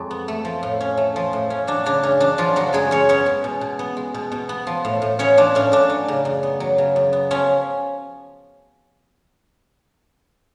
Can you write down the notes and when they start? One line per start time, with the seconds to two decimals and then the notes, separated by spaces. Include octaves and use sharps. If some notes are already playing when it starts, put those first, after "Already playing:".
Already playing: F2 G#3
0.11 B3
0.28 A3
0.45 F3
0.63 A2
0.81 C#4
0.97 A3
1.16 F3
1.33 A2
1.50 C#4
1.67 F#3 D4
1.86 C#3 D4
2.03 F#2 C#4
2.20 F#2 D4
2.38 F3 F#3 F4
2.56 C#3 F#3 F#4
2.73 F#2 G#3 G#4
2.91 F#2 C#4 C#5
3.09 B3 C#4 C#5
3.26 G#3
3.44 B2
3.61 B2
3.79 B3
3.97 G#3
4.14 B2
4.32 B2
4.49 B3
4.67 F3
4.85 A2
5.02 A2
5.19 B3 C#4 C#5
5.37 F3 D4
5.55 A2 C#4
5.72 A2 D4
5.90 F#3
6.08 C#3
6.25 F#2
6.43 B3
6.60 F#3
6.78 C#3
6.96 F#2
7.13 B3
7.31 F3 C#4